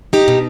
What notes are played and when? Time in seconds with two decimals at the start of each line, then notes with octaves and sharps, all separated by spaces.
0.13 D#4 G4
0.28 B2